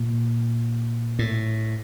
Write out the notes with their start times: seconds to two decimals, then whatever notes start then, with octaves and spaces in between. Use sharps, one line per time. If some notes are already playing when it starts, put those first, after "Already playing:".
Already playing: A#2
1.19 A2